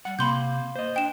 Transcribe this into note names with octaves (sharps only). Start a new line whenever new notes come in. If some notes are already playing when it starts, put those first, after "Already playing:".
G3 F#5
C3 A#3 B5 C6 G6
C5 D#5
D4 G5 E7